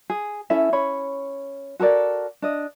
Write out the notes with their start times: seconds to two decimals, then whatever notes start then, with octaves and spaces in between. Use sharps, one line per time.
0.10 G#4
0.50 C#4 E4 A4 E5
0.72 C#4 C#5 B5
1.80 F#4 A4 A#4 D5
2.42 D4 D#5